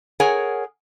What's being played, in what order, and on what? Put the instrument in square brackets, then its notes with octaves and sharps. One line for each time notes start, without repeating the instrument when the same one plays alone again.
[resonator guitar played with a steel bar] G#4 A#4 C#5 F#5 G#5